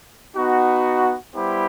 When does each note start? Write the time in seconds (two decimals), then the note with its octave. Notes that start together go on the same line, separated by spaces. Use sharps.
0.35 B3 D#4 F#4
1.34 G3 B3 E4 G4 C5